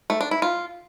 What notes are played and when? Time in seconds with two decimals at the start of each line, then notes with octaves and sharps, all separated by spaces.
0.10 A3
0.21 D4
0.31 E4
0.42 F4